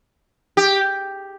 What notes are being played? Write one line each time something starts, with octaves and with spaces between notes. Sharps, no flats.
G4